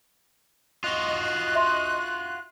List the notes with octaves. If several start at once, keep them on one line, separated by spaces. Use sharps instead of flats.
F4 F#4 D#5 F#6
E5 C6